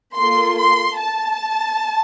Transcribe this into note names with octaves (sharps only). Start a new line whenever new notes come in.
A#3 F4 A4 C6
C6
A5